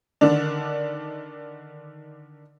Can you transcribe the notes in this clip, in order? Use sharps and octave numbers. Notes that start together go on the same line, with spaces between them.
D3 D#3 D4